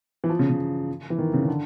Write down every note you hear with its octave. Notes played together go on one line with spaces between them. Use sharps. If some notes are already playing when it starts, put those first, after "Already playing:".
E3
F3
C#3
C#3
E3
D#3
C#3
C#3
D3